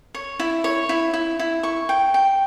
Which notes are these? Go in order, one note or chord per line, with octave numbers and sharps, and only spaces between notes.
C#5
E4
C#5
E4
E4
E4
C#6
G5
G5